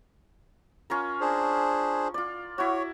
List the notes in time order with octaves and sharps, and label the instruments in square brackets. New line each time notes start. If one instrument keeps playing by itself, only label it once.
[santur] C#4 F4 A#4
[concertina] D4 G#4 C5
[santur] F4 D5
[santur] E4 F#4 [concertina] C#5